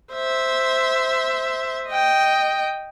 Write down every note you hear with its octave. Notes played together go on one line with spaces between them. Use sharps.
C5 E5
D#5 G5